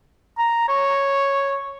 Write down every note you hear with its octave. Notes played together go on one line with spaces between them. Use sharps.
A#5
C#5